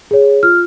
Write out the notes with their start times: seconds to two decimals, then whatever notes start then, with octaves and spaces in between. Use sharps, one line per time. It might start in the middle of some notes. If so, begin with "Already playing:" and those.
0.11 G#4 C#5
0.43 F4 F6